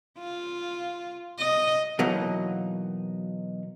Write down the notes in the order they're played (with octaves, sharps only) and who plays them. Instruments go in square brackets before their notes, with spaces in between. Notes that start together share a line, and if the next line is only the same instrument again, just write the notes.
[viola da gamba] F4
D#5
[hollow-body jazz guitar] B2 E3 F#3 A#3 D#4